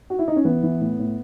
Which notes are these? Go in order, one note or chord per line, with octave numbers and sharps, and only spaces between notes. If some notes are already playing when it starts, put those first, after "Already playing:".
F#4
E4
D#4
C#4
E3 B3
E3
A2
A2